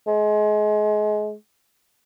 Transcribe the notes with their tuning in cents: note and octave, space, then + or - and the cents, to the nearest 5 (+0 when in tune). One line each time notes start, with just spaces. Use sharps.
G#3 +30